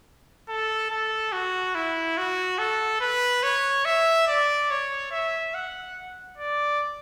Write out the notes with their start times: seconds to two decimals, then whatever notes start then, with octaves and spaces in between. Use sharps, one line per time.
0.49 A4
0.90 A4
1.32 F#4
1.75 E4
2.17 F#4
2.59 A4
3.01 B4
3.43 C#5
3.85 E5
4.27 D5
4.70 C#5
5.12 E5
5.54 F#5
6.38 D5